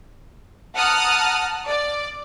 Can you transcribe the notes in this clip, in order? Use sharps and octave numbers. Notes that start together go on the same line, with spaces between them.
F#5 A5 A#5 D#6 F6 F#6
D5